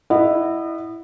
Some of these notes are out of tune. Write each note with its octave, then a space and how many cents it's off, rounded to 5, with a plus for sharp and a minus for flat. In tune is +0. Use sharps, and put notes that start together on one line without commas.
E4 +0 D#5 -30 F#5 +0